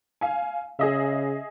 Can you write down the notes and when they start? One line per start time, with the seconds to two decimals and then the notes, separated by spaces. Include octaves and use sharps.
0.21 F5 G#5
0.79 C#3 G#4 D#5 E5